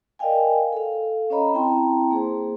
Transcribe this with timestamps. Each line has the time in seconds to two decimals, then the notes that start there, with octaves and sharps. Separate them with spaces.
0.19 A#4 D5 D#5 F5 G5 G#5
0.73 A4 F5
1.30 C#4 C#5 D#5 A#5 B5
1.54 C4 E4 G5 A5 A#5 C6
2.11 A#3 G#4 C5